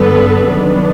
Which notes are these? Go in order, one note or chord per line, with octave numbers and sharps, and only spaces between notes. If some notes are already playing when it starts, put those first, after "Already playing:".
Already playing: G2 D3 G3 B3 A4 B4
C3 D#3 F#3 B3 D4